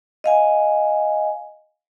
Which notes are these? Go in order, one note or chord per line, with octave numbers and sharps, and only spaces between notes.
D#5 F5 G#5